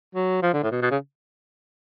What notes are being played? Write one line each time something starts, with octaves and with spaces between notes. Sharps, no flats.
F#3
F3
D3
A2
B2
B2
C#3